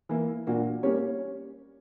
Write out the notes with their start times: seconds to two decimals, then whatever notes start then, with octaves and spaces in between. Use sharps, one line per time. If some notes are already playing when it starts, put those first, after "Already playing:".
0.09 E3 A#3 E4
0.47 A#2 A#3 D4 F#4
0.83 G3 A#3 C#4 G4 C#5